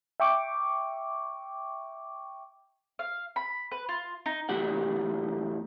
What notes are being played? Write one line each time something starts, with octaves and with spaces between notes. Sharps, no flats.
E5 G5 C#6 D6
F5
B5
B4
F4
D#4
E2 A2 F#4 G4 F#5